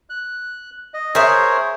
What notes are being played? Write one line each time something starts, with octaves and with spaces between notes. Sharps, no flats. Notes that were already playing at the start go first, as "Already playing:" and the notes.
F#6
D#5
G#4 A#4 C5 C#5 E5